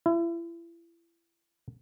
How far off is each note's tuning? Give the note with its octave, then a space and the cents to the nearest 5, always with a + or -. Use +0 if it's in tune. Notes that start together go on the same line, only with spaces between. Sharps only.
E4 +35